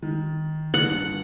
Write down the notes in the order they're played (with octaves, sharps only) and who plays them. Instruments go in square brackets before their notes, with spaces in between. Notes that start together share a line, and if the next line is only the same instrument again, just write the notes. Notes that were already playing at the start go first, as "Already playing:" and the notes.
[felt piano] D#3
[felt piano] G1 [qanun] F#5